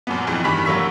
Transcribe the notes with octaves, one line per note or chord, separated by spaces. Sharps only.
F#2 A#2 B3
A#1 F2 E3
G2 D#3 E3 B5 B6
F1 F#3 A#3 C#6 E6 B6